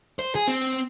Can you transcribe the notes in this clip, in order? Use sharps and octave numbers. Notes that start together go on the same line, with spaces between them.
C5
G#4
C4